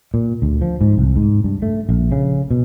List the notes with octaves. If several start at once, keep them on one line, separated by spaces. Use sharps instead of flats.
A#2
D2
F3
G#2
C2
G#2
G2
A3
A#1
C#3
B2